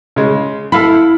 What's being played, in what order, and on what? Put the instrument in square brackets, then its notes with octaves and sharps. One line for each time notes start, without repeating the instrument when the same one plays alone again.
[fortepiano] C#3 G#3
[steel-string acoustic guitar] E4 [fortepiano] A4 F5 B5